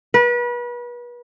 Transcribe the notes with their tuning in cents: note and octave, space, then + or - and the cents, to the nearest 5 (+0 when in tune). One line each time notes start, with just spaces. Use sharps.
B4 -35